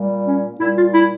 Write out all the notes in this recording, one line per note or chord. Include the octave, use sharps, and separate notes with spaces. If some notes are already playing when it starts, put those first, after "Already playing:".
Already playing: A#2 G3
C#4
A#2 G3 E4
F4
E4